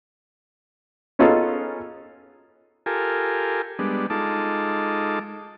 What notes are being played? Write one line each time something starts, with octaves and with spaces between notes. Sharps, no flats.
B3 C#4 D#4 F4 G#4 A4
F4 G4 A4 A#4 G#5
G3 G#3 B3 D4
G#3 D#4 F4 A4 A5 D6